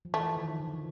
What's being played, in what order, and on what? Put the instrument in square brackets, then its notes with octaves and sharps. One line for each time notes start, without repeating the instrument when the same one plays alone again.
[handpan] F3
[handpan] E3 [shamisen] A3
[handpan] D#3
D3
F3